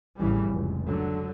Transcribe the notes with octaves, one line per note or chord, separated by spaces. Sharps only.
A1 F2 A2 C#3 E3 G3
F1 C#2
D3 F#3